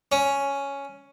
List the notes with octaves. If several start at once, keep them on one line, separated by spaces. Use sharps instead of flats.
C#4